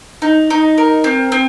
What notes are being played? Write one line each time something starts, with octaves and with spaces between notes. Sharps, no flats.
D#4
D#4
A#4
C4
C4